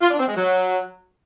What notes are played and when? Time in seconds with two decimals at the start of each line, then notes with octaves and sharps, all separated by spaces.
0.01 F4
0.10 D4
0.19 C4
0.28 G#3
0.36 F#3